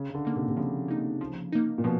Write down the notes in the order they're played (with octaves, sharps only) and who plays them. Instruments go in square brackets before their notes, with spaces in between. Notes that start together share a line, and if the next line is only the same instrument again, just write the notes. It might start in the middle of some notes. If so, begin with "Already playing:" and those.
Already playing: [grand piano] C#3
C#3
D3
[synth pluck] A#3 D#4
[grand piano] C3
C3
[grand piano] C#3 [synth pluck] F3
[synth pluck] A#3 D#4
F3
A#3 D#4
[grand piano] A#2
[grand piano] B2 [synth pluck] F3